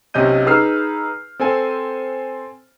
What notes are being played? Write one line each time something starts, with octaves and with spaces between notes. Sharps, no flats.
B1 C3 C#4 D#5 G6 D#7
D#4 G#4 B4 E6 F6 C7
C4 A4 C5 G#5